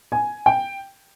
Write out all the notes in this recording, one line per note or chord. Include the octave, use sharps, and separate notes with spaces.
G#5
G5